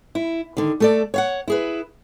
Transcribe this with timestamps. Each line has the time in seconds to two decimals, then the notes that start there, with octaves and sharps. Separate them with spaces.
0.15 E4
0.57 D3 D#3
0.80 A3 A4 D5
1.14 C#5 F5 F#5
1.48 E4 G#4 B4